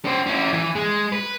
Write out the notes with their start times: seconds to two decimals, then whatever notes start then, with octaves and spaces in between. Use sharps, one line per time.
0.05 C#4 C5
0.26 C#4 E4
0.53 E3
0.75 G#3
1.12 B4